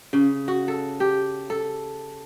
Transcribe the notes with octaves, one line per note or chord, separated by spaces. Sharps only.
C#3
F#4
A4
G4
A4